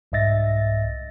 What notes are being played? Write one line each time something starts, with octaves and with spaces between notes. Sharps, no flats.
C2 G#2 D#5 E5 A6 A#6